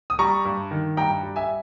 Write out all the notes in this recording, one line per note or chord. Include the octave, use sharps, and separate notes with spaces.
D#6
G3 A#5 C#6
G2
D#3
G2 G5 A#5
G3
E5 G#5